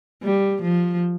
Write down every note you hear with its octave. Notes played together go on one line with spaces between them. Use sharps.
G3
F3